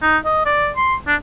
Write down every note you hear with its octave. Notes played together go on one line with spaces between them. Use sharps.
D#4
D#5
D5
C6
D4